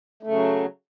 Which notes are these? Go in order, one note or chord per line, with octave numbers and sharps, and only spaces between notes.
C#3 F#3 A3